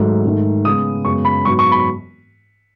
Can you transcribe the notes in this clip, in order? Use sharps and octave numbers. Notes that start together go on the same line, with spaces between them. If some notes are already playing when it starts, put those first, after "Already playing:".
Already playing: G#2 D#3 F#3 A3
G#2 D#3 A3
C#3 G#3 B3 D#6
F#2 C#3 G#3 B3 C#6
B5
G#2 F#3 B3 C#6
C#6
B5